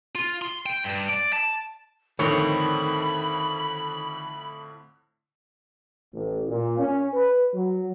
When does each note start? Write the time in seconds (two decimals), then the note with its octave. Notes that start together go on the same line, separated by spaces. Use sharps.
0.15 F4
0.42 C6
0.66 G5
0.84 G2
1.09 D5
1.33 A5
2.19 F2 A2 D3 D#3 C4 C#5 B5
6.14 A1
6.48 A#2
6.78 C#4
7.14 B4
7.54 F#3